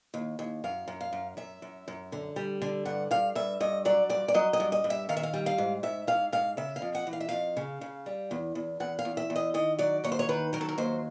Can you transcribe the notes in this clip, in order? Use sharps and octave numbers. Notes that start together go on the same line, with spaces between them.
D#2
D#2
F#2 F5
F#2
F5
F#2
F#2 E5
F#2
F#2
D3
G3
D3
G2 F#5
G2 F5
G2 E5
G2 D#5
F#3 D5
G2 D5
D5
F#3 D#5
D#5
G2
D#5
G2
E5
D#3 F5
E5
F5
G3
F5
G#2
G#2 E5
G#2 F5
G#2 F5
C#3 E5
F5
F2
F#5
E3
F5
E5
F2 F5
C#3
C#3
G3
E2
E2
E2 F#5
F5
E2
E5
E2
D#5
D#3 D#5
F#3 D5
D#2 C#5
C5
C#5
D#3 B4
F#3 A#4
A4
A#4
D#2 C5